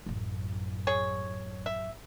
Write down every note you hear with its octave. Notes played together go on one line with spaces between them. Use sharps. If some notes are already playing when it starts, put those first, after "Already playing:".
A1 F#2
G#4 C#5
E5